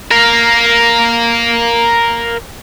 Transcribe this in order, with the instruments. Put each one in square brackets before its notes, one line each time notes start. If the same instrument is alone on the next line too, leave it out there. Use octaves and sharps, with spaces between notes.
[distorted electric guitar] A#4 F5